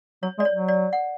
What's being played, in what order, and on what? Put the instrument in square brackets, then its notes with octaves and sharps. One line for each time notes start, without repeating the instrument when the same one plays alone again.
[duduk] F#3 [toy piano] C#5
[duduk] G#3 [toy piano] D5
[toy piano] C#5
[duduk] F#3
[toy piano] D5
F#5